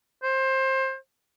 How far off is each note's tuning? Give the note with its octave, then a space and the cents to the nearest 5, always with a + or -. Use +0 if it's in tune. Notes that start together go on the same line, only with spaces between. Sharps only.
C5 +20